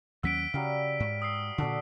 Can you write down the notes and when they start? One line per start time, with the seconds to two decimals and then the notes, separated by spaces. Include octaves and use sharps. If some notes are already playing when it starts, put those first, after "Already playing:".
0.23 D#2 F#3 C#4 F#5 E6 B6 D7
0.54 C#3 F#3 G3 F5
1.00 G#2
1.22 D#6 E6 C7
1.58 A#2 D3 F#4 A4 D5